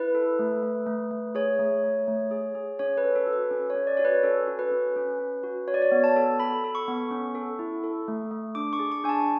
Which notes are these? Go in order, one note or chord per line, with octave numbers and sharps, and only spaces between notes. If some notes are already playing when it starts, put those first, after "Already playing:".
Already playing: E4 B4
A4
A3
A3
A3
A3
G#4 C#5
A3
A3
A3
G#4
G#4
C#4 C#5
B4
A4
A4
F#4
B4
C#4
C#4 C#5
D5
F#4 C#5
B4
C#4 A4
F#4
B4
C#4
C#4
C#4
F#4
F#4 C#5
D5
C#5
B3
A5
A4
A4 B5
A4
C#6
B3
C#4
A4
E4
A4
A3
A3
D4 D6
C#6
G#4
C#6
D4 G#5
A5